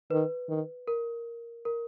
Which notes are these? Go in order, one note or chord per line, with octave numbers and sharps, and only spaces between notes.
D#3 B4
D#3
A#4
A#4